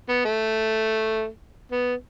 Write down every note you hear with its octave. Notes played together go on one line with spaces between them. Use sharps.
B3
A3
B3